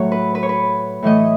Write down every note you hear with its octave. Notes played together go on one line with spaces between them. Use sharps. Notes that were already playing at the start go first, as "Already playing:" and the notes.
Already playing: A2 F#3 A3 C#5
B4
B4
C#5
B4
A2 E3 A3 D#5